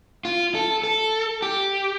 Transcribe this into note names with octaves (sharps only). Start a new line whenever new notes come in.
F4
A4
A4
G4